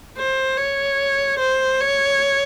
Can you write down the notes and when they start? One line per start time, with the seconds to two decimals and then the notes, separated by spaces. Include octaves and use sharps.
0.17 C5
0.58 C#5
1.40 C5
1.80 C#5